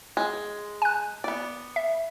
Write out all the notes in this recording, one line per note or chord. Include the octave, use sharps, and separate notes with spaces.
G#3
G#5 F#6
B3 D5
E5